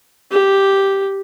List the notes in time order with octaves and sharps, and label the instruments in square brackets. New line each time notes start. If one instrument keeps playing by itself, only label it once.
[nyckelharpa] G4